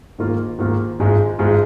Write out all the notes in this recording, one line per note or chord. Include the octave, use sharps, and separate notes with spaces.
G#2 D#3 A#3 F4
G#2 D#3 A#3 F4
G#1 G#2 G#3 F4
G#1 G#2 G#3 F4